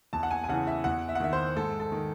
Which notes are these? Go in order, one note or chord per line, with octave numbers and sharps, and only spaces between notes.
E2 A5
F#5
G#5
G#5
C#3 E3 F#5
E5
E2 F#5
E5
F#5
D#3 E5
C5
G#2 A4
A4
D#3